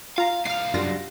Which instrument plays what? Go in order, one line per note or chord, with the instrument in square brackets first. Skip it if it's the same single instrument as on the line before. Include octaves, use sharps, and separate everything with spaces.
[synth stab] F4 A#5 [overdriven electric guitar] F5
[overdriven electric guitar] C2 F5 [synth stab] F6 C7
[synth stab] F#2 F4 A#6 [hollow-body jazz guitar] F#3 G3 D4